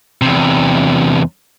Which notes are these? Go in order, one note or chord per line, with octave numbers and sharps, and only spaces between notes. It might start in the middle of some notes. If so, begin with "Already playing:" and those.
E2 C3